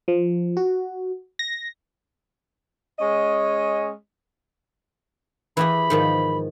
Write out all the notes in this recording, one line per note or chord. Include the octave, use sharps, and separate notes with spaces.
F3
F#4
A#6
G#3 C#4 D#5
E3 G4 G#4 B5
G#2 D#3 F3